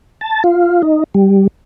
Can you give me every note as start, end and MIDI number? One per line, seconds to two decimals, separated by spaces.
0.21 0.43 81
0.44 0.82 65
0.82 1.04 63
1.14 1.47 55